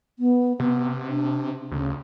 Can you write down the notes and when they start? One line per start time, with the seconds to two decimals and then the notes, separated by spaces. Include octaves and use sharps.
0.19 B3
0.59 C3 B3
1.09 D4
1.71 D2 C#3